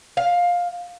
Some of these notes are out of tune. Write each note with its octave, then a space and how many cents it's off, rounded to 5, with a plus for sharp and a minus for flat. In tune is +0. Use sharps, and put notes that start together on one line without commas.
F5 +15